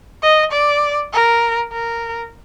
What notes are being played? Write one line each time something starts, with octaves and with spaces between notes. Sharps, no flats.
D#5
D5
A#4
A#4